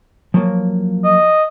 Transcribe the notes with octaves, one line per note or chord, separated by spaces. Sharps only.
F3 F#3 A#3
D#5